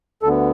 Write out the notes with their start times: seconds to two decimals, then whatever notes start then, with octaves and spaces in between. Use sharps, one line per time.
0.23 D2 D3 B3 A4